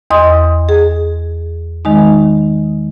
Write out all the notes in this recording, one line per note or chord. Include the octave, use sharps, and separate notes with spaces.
E2 D#5 C6 D#6
G#4
D#3 G#3 D#4